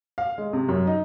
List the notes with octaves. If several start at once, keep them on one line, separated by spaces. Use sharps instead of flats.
F5
G#3
C3
F#2
D#4